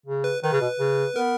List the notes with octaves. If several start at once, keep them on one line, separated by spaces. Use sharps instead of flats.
C#3
B4
D#3 B4
C#3
B2
C#3
B3 A#4